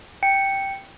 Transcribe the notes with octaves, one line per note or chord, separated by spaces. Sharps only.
G5 C#7